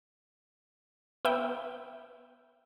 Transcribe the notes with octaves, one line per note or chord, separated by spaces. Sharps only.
B3 E5 G5